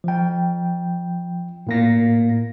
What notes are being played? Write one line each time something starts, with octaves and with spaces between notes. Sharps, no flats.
F3 G5
A2 A#3 A#6